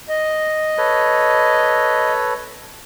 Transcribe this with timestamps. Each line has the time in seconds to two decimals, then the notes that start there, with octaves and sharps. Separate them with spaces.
0.09 D#5
0.78 A4 B4 C#5